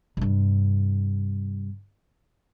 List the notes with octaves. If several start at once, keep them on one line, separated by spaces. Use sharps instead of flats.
G2 C3